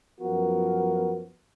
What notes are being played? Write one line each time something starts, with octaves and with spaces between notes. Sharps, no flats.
F#2 F3 B3 F#4 A#4